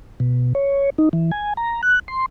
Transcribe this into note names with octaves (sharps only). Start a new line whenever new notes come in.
B2
C#5
D#4
E3
G#5
A#5
F#6
C6